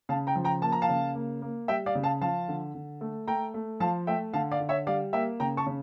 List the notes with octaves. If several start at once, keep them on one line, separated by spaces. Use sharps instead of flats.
C#3 F5 A5
G5 A#5
F3
G5 A#5
A#3 A5
A#5
F5 A5
C#3
A#3
A#3
G3 E5 G5
D5 F5
C#3
F5 A5
F3 F5 A5
D3
D3
A3
A3 G5 A#5
A3
F3 F5 A5
A3 E5 G5
D3 F5 A5
D5 F5
D3
C#5 E5
G3 D5 F5
A#3 E5 G5
C#3 G5 A#5
A5 C#6
C#3